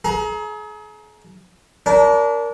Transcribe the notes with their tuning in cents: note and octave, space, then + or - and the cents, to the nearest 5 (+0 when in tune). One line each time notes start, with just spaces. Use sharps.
G#4 +40 A#5 +15
D4 -30 A#4 +0